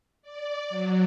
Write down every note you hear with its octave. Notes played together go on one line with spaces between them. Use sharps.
D5
F#3